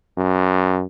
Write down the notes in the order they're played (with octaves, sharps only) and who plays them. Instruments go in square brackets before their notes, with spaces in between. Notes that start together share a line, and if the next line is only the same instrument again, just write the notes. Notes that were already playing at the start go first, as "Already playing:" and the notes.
[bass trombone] F#2